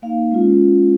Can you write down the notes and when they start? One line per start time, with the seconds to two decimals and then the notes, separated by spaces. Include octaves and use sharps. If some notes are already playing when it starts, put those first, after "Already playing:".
0.02 A#3 D#4 F5
0.31 G#3 C#4 F4